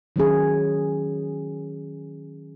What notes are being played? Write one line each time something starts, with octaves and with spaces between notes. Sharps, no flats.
D#3 F#3 C#4 G#4